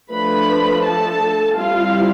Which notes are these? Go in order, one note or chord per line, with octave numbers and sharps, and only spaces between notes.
F3 A3 D4 B4 B5
A4 A5
G3 C4 E4 F4 F5